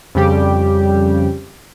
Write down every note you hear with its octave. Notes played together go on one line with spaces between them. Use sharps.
F2 C#3 G3 G4